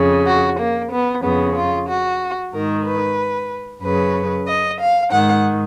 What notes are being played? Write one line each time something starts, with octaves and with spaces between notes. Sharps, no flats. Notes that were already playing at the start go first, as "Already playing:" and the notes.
Already playing: F2 C#3
F#4
A#3
B3
F2 C#3 B3
F4
F#4
G#2 D#3 A#4
B4
F#2 C#3 B4
D#5
F5
G#2 D#3 F#5